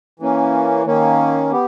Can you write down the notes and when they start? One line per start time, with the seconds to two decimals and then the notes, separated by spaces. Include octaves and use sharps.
0.20 E3 A#3 C#4
0.86 D#3 A#3 C#4
1.52 B3 G4